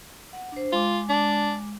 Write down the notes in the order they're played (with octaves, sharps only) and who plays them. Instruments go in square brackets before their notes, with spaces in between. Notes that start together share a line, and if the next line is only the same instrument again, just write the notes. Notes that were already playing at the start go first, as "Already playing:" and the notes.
[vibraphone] F#5
D4 C5
[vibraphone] G#3 D6 [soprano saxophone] F4
[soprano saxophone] D4